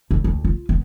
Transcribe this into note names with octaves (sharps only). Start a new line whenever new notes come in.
G2
D2
F4
B3